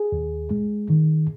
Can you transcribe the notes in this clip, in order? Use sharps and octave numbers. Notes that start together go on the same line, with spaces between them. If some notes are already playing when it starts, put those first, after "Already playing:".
Already playing: G#4
D#2
G#3
D#3